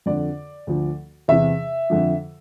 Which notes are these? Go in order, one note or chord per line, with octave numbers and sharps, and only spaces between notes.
F2 D3 F3 D5
D2 D3 F3
E2 C3 E3 E5
F2 D3 F3